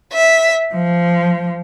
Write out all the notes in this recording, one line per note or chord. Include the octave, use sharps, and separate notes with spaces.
E5
F3